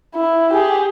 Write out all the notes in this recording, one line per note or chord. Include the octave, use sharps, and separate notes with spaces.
E4
G4 G#4